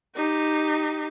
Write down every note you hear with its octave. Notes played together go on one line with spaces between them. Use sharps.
D#4 G4